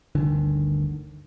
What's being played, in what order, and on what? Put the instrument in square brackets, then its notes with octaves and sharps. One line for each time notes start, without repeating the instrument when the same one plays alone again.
[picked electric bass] G1 D2 D3 D#3